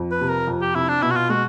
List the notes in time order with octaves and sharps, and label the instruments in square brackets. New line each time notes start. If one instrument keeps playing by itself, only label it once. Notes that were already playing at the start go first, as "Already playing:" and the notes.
Already playing: [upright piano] F2
[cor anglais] B4
[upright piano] C3
[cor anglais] A#4
[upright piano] F2
[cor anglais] G4
[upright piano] C3 [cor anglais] E4
[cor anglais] D4
[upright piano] B2 [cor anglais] E4
[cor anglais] F#4
F4
[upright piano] G#3 [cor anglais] F#4